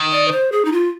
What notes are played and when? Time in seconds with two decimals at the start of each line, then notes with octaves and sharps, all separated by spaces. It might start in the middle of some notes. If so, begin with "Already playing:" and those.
Already playing: D#3
0.12 D5
0.28 B4
0.32 C5
0.52 G#4
0.65 D#4
0.72 F4